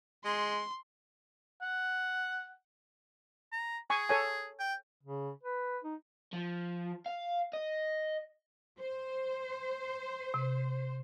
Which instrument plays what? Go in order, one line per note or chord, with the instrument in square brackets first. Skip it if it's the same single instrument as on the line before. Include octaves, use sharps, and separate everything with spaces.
[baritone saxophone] G#3 [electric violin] C6
[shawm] F#5
A#5
[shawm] G#4 [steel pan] G#5 C#6
[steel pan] A4 C#5 G#5
[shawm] G5
[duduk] C#3
B4
D#4
[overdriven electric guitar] F3
F5
D#5
[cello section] C5
[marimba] C3